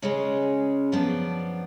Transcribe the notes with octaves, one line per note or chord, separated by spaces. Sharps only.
C#3 G#3 C#4
F#2 F3 B3 D4